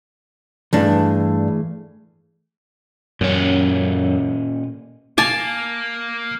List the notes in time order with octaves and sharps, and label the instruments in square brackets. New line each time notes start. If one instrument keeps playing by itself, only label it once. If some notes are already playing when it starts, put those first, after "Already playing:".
[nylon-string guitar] G2 D4 [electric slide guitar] E3 A3 G#4
[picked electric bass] F#2 [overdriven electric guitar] A#2 C#4
[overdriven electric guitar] A#3 [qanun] G#5 A5 [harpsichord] D6